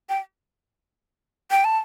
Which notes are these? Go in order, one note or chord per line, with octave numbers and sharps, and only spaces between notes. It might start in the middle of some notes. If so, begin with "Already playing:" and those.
G5
G5
A5